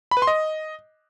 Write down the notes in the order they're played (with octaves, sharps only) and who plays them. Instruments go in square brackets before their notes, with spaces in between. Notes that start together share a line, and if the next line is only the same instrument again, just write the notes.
[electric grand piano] B5
B4
C6
D#5